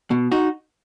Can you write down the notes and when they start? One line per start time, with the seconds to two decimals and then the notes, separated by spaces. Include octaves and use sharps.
0.11 B2
0.32 D#4 F#4